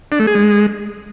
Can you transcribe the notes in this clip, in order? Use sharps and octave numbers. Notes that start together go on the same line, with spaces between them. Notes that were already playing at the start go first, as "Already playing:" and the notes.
D4
A3
G#4
G#3